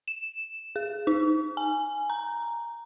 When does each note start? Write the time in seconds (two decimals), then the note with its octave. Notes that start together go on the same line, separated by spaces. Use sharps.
0.08 E7
0.76 G#4
1.07 D#4
1.57 G#5
2.10 A#5